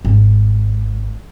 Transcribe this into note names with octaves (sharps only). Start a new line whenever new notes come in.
G#1